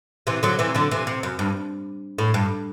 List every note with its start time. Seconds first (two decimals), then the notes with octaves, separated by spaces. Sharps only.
0.27 C3 E3
0.43 D3 F#3
0.59 C3 E3
0.75 D3 F#3
0.91 C3 E3
1.07 C3
1.23 F#2
1.39 G2
2.18 A2
2.34 G2